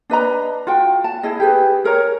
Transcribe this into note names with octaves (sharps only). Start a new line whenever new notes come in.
D4 B4 D#5 A#5
F4 F#4 G5
A5
E4 G#4 D#5
G4 G#4 B4
G#4 A#4 C#5 A#5